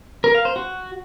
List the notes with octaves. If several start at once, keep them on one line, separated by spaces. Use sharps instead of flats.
A#4
F5
C5
F#4